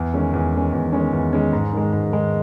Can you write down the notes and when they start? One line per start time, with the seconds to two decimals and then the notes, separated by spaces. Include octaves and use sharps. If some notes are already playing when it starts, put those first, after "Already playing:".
Already playing: E2
0.14 D#3 G#3 C#4
0.33 E2
0.53 D#3 G#3 C#4
0.73 E2
0.93 D#3 G#3 C#4
1.13 E2
1.33 D#3 G#3 C#4
1.53 G#2
1.73 D#3 G#3
1.93 G#2
2.12 D#3 G#3